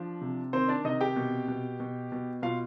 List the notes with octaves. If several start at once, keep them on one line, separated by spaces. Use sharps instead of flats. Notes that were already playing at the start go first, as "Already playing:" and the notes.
Already playing: F3 D4
C3
D#3 C4 C5
D4 D5
C3 D#4 D#5
G4 G5
B2
B2
B2
B2
B2 F4 F5